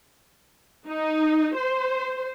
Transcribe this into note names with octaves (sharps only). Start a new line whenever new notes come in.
D#4
C5